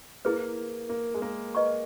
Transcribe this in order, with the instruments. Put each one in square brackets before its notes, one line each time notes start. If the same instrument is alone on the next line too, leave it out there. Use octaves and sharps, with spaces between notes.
[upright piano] A#3 [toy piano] E4 G#4 B4
[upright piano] A#3
G#3
A#3
[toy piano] B4 D#5 A#5 C#6